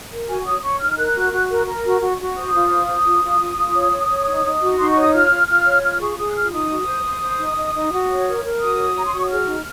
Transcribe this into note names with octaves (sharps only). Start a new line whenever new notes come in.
A#4
F#4 G#5
C#5 D#6
C#5 C#6
D#4 F6
A#4 F#6
F#4
F#4
A#4
A#4
F#4
F#4
F#4
C5 D#6
F4
C5
C5
F4
F4
F4
F4
C#5
C#5
C#5
D#4
D#4
F#4
D#4 C6
C#6
C#5
D#6
F4 F6
F4
F4 F6
C#5
F4 F6
G#4 C#6
G#4 D#6
F#6
F4 F6
D#4 D#6
F#4
C5
C5
C5
D#4
D#4
D#4
F#4
C#5
A#4
A#4
F#4 D#6
C#5
C#5 A#5
C6
F#4 C#6
D#6
G#4 F6
D#4